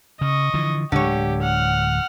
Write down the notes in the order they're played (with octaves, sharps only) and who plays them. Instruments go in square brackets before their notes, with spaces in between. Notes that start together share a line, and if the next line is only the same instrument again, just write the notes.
[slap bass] C#3 [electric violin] D#5 C#6
[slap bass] D3 E3 F3
[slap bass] D1 G#3 [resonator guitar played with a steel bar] D3 C#5 [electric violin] G4
[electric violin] F#5 F6